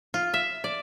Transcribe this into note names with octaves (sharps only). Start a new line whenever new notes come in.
F4
E5
D5